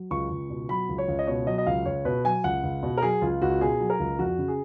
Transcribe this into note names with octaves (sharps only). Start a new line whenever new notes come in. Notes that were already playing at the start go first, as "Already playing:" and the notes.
Already playing: F#3
C#2 C#6
C#2
B2
F#3 B5
C#2
C#5
C#2
D#5
B2 C#5
F#3 D#5
D#5
C#2 F5
C#2 C#5
B2 B4
F#3 G#5
C#2 F#5
C#2
B2
A#4
F#3 G#4
C#2 F4
C#2 F#4
B2 G#4
F#3
A#4
C#2
F2 F#4
C#3
G#4